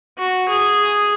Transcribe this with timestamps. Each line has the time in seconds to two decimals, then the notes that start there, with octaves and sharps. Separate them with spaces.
0.18 F#4
0.49 G#4